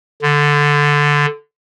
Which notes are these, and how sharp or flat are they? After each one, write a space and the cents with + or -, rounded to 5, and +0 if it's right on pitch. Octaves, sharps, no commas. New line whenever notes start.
D3 -5